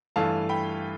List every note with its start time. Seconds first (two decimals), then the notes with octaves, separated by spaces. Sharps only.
0.16 G2 E3 A3 F5 A5
0.49 G5 B5